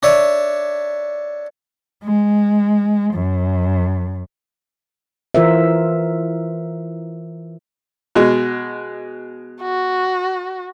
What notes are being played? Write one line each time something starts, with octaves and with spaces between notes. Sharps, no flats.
D4 C#5 E5
G#3
F#2
E3 F4 A#4 C5 E5
B2 G#3
F#4